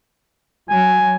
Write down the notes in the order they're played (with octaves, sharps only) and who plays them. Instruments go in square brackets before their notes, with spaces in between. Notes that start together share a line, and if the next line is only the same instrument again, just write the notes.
[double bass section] F#3 [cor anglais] G#5